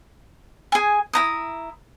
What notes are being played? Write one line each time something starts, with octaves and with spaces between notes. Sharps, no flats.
G#4 G#5
E4 A#5 D#6